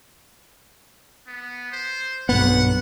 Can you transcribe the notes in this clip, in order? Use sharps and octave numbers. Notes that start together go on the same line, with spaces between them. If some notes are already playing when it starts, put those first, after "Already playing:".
B3
C5
B1 G2 B3 F#5